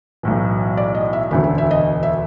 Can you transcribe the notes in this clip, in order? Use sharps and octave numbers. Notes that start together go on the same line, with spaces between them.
B1 A2 E3
D5
D#5
E5
E1 D2 D3 E5
E5
E5
D#5
E5